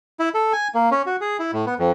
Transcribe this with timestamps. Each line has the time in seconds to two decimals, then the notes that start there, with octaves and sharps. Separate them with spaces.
0.20 E4
0.34 A4
0.53 G#5
0.75 A#3
0.92 C#4
1.06 F#4
1.21 G#4
1.39 E4
1.53 A2
1.66 B3
1.79 F2